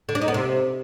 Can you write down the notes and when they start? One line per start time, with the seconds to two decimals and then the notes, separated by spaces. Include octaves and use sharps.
0.09 D3
0.15 D4
0.21 D#4
0.28 B3
0.34 C3